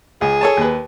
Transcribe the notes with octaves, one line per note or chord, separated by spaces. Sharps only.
C#2 G#4
A4 C#5 A5
D#2 B4